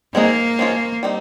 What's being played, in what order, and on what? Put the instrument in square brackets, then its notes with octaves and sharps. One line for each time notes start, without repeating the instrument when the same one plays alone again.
[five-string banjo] G#3 C4 D#4 G#4 [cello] A#3
[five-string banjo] F3 G#3 C#4 F4
G3 C4 D#4